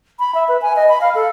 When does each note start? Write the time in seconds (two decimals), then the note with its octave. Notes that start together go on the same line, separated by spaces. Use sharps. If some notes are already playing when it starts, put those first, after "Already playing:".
0.19 B5
0.34 E5
0.48 B4
0.62 G#5
0.76 D#5
0.89 B5
1.01 F5
1.15 A4